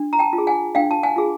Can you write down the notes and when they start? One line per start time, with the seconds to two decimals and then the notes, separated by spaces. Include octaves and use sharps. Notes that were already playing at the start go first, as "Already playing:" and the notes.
Already playing: D4
0.13 A#5
0.19 G5 A5
0.33 F4
0.38 G#4
0.47 F#5 G#5
0.75 D4 F5 G5
0.91 A5
1.03 F#5 G#5
1.16 F4 G#4